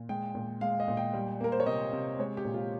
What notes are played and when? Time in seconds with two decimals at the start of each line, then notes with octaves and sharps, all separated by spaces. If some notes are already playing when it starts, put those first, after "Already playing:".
Already playing: A#2
0.09 G#3 G5
0.35 A#2
0.61 G#3 F5
0.80 D#5
0.88 A#2
0.97 G5
1.14 G3
1.40 A#3 A#4
1.52 C5
1.60 C#5
1.66 C3 D#5
1.93 C3
2.19 G#3 C#5
2.37 G4
2.45 A#2
2.54 F4